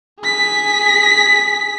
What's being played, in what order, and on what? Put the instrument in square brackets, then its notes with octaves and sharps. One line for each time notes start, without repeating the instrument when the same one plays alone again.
[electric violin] G#4 B6